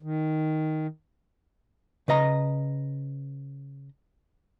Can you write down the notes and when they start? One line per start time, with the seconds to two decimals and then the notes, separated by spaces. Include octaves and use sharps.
0.02 D#3
2.08 C#3 B4 D#5 A#5